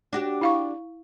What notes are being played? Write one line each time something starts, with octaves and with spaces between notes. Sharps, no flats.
D4 F#4 G4
E4 F5 C#6